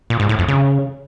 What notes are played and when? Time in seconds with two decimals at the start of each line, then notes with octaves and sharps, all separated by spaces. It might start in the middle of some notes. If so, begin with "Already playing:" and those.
0.10 A#2
0.20 G#2
0.29 A2
0.39 F2
0.48 C#3